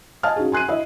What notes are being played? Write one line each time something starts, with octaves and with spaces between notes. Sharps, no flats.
D#5 F5 G#5 A5 F6
C#4 D#4 F#4 G#4
G#5 C6 F#6 C7 D#7
E4 D#5 E5